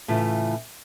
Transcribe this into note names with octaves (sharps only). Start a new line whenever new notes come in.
A2 C#3 E3 F4